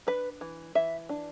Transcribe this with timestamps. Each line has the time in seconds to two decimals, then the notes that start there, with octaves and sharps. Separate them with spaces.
0.07 D4 B4
0.41 E3
0.75 E3 E5
1.09 D4